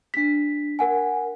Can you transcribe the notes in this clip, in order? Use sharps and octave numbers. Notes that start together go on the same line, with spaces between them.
D4 B6
A#4 F#5 G#5